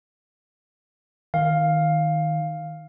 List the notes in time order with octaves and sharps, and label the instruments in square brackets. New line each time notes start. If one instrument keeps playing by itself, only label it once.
[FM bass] D#3 [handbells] F5